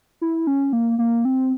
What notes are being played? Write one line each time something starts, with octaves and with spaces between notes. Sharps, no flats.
E4
C#4
A#3
A#3
C4